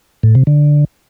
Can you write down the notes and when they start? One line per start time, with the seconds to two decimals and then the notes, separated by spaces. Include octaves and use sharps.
0.23 A2
0.35 C3
0.47 D3